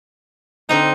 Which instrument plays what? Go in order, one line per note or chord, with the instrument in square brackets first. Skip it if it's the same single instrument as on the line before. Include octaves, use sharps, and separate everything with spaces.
[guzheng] D3 C4 A#5 [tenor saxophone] D#4